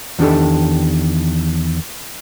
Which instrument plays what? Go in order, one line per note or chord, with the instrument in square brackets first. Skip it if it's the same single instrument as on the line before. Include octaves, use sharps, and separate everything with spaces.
[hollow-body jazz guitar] E2 D#3 D4 G4 A4